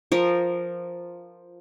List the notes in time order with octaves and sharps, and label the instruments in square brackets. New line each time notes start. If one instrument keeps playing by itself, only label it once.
[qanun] F3 A#4